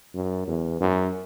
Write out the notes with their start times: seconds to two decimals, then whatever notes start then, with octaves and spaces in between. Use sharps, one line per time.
0.15 F#2
0.47 E2
0.81 F#2